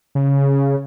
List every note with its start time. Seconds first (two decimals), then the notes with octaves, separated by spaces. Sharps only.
0.15 C#3